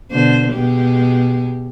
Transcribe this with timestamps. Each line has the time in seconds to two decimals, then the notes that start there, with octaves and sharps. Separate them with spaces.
0.11 B2 D3 C5
0.53 B2 G#3 G4